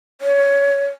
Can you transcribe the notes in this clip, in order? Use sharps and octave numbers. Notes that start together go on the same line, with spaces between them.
C#5